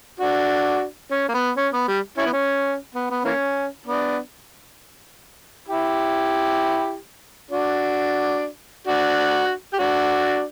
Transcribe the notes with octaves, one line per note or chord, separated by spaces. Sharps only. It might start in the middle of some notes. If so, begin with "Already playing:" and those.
D4 F#4
C#4
A#3
B3
C#4
B3
G3
C#4 E4
B3
C#4
B3
B3
E3 A#3 C#4
B3 D4
E4 G4
D4 F#4
D4 F#4
G4
D4 F#4